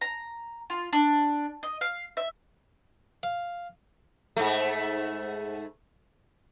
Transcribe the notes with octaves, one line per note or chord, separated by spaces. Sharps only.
A#5
F4
D4
D#5
F5
E5
F5
G#2 A3